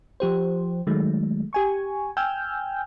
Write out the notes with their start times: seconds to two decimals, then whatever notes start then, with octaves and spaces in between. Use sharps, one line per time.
0.20 F3 G4 C5
0.87 D#3 F#3 G#3 A3
1.53 G4 G#5 C#6
2.17 G5 G#5 E6 F6 G6